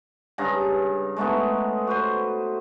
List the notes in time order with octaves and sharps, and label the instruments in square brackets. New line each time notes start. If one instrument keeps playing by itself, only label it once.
[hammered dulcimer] G2 C#3 G#4 A#5
G#3 A3 B3 D#4
F#4 B4 C5